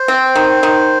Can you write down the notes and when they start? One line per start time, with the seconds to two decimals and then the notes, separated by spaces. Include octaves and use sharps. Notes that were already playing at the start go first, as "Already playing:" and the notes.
Already playing: C5
0.08 C4
0.35 D#3
0.63 D#3